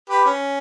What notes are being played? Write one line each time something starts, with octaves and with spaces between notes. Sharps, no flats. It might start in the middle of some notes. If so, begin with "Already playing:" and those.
G4 B4
C#4